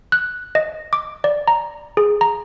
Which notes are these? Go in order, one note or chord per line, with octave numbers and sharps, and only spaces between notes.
F#6
D#5
D6
D5
A#5
G#4
A#5